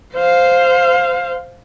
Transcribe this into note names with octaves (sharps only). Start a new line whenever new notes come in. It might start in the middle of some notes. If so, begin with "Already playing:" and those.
C5 F5